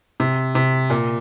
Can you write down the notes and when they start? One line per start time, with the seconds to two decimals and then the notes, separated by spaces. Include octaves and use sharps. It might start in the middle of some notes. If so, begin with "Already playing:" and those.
0.20 C3
0.55 C3
0.90 A#2